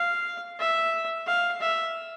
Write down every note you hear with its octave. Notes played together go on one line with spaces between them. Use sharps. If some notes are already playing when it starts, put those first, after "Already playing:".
Already playing: F5
E5
F5
E5